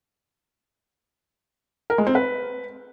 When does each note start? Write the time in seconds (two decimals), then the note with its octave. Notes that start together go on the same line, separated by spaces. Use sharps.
1.90 A#4
1.98 G#3
2.07 C4
2.15 B4